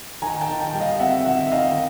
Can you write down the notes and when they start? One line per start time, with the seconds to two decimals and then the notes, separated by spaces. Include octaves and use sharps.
0.22 D#3 G#5 A#5
0.41 G5 A5
0.48 D#3
0.60 G5 A5
0.73 G3
0.80 D#5 F5
1.00 C4 E5 F#5
1.25 D#3 E5 F#5
1.52 D#3 D#5 F5